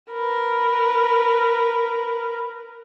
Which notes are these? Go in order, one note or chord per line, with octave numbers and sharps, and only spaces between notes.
A#4 B4